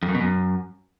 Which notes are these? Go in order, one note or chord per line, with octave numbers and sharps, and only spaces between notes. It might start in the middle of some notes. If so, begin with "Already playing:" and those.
F2
F#2
B2
F#2